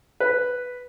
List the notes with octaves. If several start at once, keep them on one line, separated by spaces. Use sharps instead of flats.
B4